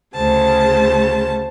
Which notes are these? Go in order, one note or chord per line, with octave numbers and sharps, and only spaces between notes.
D2 C#3 C5 A5